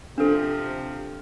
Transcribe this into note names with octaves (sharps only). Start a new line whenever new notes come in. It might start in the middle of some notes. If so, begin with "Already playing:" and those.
C3 F3 D4 A4